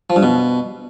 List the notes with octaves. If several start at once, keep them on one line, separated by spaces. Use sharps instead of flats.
F3
G2
B2